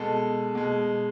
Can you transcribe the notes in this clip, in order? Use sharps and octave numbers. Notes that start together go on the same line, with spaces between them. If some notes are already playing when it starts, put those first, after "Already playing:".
Already playing: B2 G#3 A4
B2 G#3